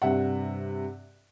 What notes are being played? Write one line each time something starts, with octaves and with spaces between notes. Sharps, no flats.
G2 C3 E5 F#5